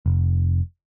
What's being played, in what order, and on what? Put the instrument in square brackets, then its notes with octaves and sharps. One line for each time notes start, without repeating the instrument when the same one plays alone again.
[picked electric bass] F1